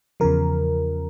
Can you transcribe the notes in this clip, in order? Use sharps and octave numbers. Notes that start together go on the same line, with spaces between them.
E2 C#3 F3 A#4